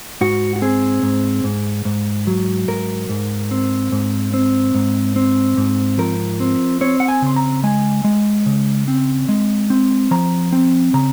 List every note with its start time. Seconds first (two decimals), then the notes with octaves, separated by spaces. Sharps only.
0.21 G#2 F#4
0.56 F#4
0.62 C4 G#4
1.03 G#2
1.44 G#2
1.85 G#2
2.27 F#3
2.68 G#2 A#4
3.09 G#2
3.51 C4
3.92 G#2
4.34 C4
4.75 G#2
5.16 C4
5.57 G#2
5.98 F3 A#4
6.40 C4
6.81 C4 C#5
7.00 F#5
7.08 G#5
7.22 C#3 C6
7.36 A#5
7.63 G#3 G#5
8.04 G#3
8.46 C#3
8.88 C4
9.29 G#3
9.70 C4
10.11 F3 A#5
10.52 C4
10.94 C#3 A#5